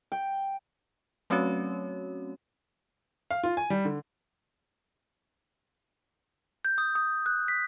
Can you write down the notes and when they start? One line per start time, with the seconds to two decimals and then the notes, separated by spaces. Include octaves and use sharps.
0.12 G5
1.30 F#3 A3 C4 C#4 F#4 C#5
3.31 F5
3.43 F4
3.57 G#5
3.70 G3
3.85 D3
6.65 G6
6.78 D#6
6.95 D#6
7.26 F#6
7.48 B6